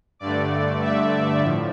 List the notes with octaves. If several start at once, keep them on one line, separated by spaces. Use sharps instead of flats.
G2 D3 A3 D5
E5
A2 F3